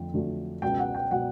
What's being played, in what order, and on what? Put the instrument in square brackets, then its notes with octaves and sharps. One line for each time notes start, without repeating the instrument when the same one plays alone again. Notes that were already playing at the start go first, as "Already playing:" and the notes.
Already playing: [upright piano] F2 D3 A3
F2 D3 F#3 A3
C#2 B2 F#3 G5
F#5
G5
B2 F#3 F#5